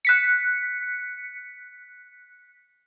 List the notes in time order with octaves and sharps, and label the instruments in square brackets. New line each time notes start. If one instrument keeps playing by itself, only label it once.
[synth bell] F#6 B6 C#7